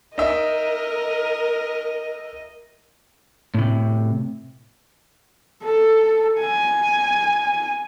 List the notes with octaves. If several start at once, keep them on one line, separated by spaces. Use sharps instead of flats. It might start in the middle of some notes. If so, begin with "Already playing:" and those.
D#4 A#4 D#5 E5
A2 C3
A4
G#5